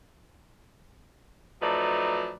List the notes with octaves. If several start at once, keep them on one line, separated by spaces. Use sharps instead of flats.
F3 F#3 A3 D#4 B4 D5